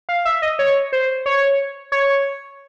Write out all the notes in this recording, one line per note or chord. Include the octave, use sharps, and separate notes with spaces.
F5
E5
D#5
C#5
C5
C#5
C#5